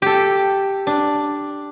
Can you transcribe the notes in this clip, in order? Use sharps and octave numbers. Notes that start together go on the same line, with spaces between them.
G4 A4
D4